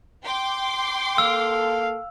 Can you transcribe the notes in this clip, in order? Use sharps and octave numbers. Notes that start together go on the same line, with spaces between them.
G5 C6 D6
A#3 A4 F5 E6